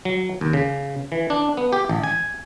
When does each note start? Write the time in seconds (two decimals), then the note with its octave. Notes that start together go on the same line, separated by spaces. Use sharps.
0.05 F#3
0.41 D#2
0.53 C#3
1.12 E3
1.30 D4
1.57 B3
1.73 G4
1.89 A1
2.03 G#5